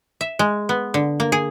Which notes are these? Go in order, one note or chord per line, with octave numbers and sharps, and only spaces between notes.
E5
G#3
B3
D3
A#3
G#4